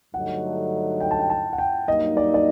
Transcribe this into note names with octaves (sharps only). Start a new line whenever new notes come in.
G2 D3 F#3 A3 D#4 F#5
G5
A5
G5
A5
F#5
G5
G2 F#3 A#3 D#4 D#5
D5
D5